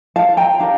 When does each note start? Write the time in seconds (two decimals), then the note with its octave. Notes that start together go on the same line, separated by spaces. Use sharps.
0.16 F5 A5
0.37 G5 A#5
0.59 D4 G4 A#4 F5 A5